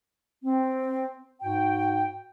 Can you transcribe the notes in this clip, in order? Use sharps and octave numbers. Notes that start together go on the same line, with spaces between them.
C4
G#2 F#4 G5